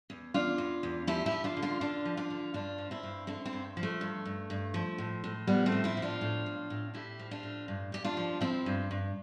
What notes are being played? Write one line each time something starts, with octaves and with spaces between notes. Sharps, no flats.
E2
E2 D4 F4
E2
E2
F3 E4 G4
E4 G4
F3
D4 F4
D3
D4 F4
D3 D4 F4
F3
D4 F4
D3
G2 D4 F4
F3
C4 E4
G2
D3 C4 E4
C4 E4
G2
F3
A3
G2
G2
G2
F3
A2
A2
F3 G3 B3
A3 C4
A2
C4 E4
F3
D4 F4
A2
A2
A2
A2 E4 G4
F3
D4 F4
A2
G2
G2 G4
D4 F4
F3
F3 C4 E4
G2
G2